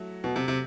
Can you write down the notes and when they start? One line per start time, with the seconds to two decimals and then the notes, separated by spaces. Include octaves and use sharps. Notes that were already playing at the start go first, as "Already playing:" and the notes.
Already playing: F#3 A3 E4
0.24 B2
0.36 C3
0.48 C3